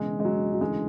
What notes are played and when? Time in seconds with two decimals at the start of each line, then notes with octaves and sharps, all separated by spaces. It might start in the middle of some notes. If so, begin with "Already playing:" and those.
Already playing: E1 E2 C#3 E3 G#3
0.20 G#3
0.25 F#3
0.54 F#3
0.61 D2 C#3 E3 G#3